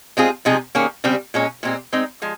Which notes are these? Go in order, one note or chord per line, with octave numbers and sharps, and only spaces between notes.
G#3 C4 F4 G#4
C3 F3 G#3 D#4 G#4
D#3 A#3 C#4 G#4
C#3 G3 C4 G4
A#2 G#3 C#4
A#2 G#3 C4 G4
G#3 C4 D#4
F3 G#3